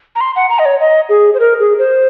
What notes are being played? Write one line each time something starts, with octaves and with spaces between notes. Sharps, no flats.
A#5
C6
F#5
A#5
D#5
C#5
D#5
G#4
C5
A#4
G#4
C5